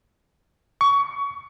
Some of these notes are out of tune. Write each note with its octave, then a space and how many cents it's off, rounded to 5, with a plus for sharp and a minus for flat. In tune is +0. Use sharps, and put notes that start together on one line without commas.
C#6 +20